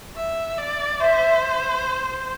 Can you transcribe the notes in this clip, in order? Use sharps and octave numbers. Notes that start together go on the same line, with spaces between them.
E5
D5
C5 E5